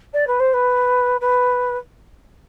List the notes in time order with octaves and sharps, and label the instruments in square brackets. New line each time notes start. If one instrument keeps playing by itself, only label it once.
[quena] D5
B4
C5
B4
B4